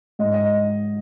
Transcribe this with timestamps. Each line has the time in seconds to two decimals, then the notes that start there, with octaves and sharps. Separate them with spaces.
0.19 G#2 D#5
0.34 D#5